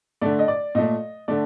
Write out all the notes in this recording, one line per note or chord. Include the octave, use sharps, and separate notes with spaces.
D3 A3 D5
D#5
D5
A#2 A3 D#5
D3 A3 D5